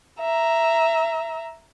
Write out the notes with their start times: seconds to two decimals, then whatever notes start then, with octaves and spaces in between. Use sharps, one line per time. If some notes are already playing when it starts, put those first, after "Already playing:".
0.19 E5 A#5